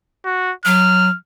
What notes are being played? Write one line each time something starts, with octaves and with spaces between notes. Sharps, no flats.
F#4
F#3 F6